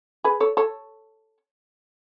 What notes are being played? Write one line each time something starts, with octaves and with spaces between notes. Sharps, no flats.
G#4 B4
A4 C#5
A4 C#5